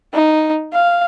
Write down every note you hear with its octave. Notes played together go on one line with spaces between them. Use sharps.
D#4
F5